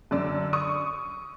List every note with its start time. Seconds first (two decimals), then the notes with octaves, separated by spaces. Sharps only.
0.11 F#2 D3 D5 E6
0.53 C#6 D#6